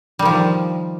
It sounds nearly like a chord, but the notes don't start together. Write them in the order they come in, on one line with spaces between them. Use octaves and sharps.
G3 D#3 F3